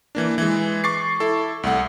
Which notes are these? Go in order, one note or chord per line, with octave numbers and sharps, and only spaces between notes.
E3 A#3 D4
E3 G#3
C#6 D6 A6 C7
E4 A4
C2 A3 F#5